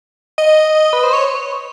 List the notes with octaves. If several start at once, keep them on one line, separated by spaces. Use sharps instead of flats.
D#5
B4
C5
C#5